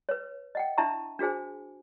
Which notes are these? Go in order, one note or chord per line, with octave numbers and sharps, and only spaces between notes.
B4 C#5
D#5 F#5 G5
D4 E4 E5 A5 A#5 C#6
D4 F#4 G#4 C5 G#5